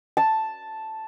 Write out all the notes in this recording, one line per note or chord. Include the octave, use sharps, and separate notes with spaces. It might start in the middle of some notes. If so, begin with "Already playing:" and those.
A5